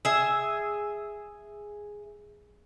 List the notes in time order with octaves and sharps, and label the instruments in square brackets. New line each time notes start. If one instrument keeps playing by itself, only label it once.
[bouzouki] G#4 E5